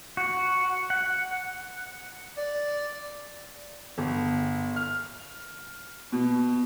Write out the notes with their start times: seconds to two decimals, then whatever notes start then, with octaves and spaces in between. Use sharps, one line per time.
0.17 F#4
0.90 F#5
2.37 D5
3.98 G1
4.76 F6
6.12 B2